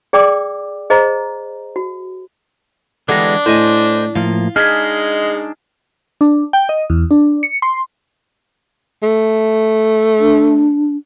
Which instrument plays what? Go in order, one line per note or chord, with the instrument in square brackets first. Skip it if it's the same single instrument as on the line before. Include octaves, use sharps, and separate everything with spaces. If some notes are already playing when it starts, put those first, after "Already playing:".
[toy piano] G#4 D5 G5 D6 E6
G#4 C5 D#5 A#5
F#4
[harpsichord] D3 G3 A#5 [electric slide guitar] E3 G#3 B3 [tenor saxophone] D4
[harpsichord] A2 D#5 G#5 [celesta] E4 [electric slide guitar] C5
[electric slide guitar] A2 F3 A#3 [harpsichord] F4
[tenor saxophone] G#3 [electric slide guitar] D4 D#4 G#4 [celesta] F6 G#6 B6
[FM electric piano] D4
G5
D#5
E2
D4
C#7
C6
[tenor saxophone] A3
[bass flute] D4